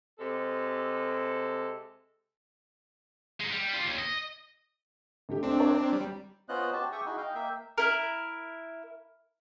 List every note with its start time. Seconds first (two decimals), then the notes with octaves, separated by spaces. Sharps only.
0.19 C3 G#3 A4
3.40 G#3 D#4
3.52 G3
3.74 F4 G4
3.87 D#2
3.99 D#5
5.29 C#2 A3 G4
5.43 C4 D4
5.60 C#5 D5 A#5
5.93 G3
6.49 B3 C#4 F4 C5 D#5 F#6
6.73 F#4 G4 A5
6.92 G4 G#4 E5 G5 C#6 D#6
7.05 D#4 E4 F#4 G#4
7.17 D#5 F5 G5
7.35 A#3 E5 G5
7.78 E4 A#4